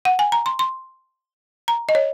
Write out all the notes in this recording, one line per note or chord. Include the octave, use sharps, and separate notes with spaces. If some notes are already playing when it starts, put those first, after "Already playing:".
F#5
G#5
A#5
C6
C6
A#5
D#5
C#5